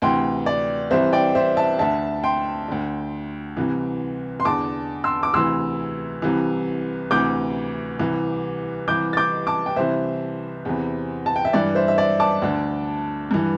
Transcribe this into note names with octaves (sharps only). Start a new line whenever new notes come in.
D2 C3 E3 G5 C6
D5
C2 C3 E3 C5 E5
D5 G5
C5 E5
E5 A5
D2 D3 E5 A5
G5 C6
D2 D3
C2 C3 E3
C6
E2 D3 A5 D6
C6 E6
D6
D2 C3 E3 C6 E6
C2 C3 E3
D2 C3 E3 D6 G6
C2 C3 E3
C2 C3 E3 D6 G6
A6
D6 G6
A5 D6
G5
C2 C3 E3 C5 E5
E2 C3 E3
A5
G5
E5
G2 E3 D5
C5 E5
E5
D5
A5 D6
D2 D3
G2 E3